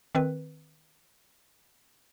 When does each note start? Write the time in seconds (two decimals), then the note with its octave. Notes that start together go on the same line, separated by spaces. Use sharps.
0.15 D#3 C4 B4